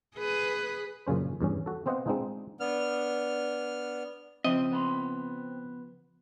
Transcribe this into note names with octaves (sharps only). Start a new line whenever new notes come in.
G#4 B4
F#2 A#2 C#3 C#4 C5
E2 G2 C#4
F#4 A4
B3 C4 C5 D#5 F5 F#5
G#3 C4 D4 D#4 F4 G#4
B3 D4 F6
C#3 F3 C4 D#5 E5
B3 B5 C6